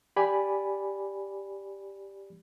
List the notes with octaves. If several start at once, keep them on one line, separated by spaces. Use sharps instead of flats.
G4 D5 G#5 B5